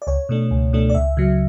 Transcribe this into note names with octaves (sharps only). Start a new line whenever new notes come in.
D5
C#2 C#5
B2 A3 D4
C#2
B2 A3 D4
D5
C#2 E5
C#3 F#3